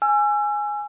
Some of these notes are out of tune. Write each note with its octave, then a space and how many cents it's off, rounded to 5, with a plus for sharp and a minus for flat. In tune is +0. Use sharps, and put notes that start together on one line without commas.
G#5 +0 E6 +35